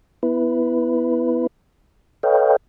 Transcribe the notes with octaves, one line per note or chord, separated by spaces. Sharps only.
B3 E4 B4
A4 B4 C#5 D#5 F5 G5